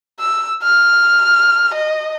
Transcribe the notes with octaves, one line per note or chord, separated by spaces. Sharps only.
E6
F6
D#5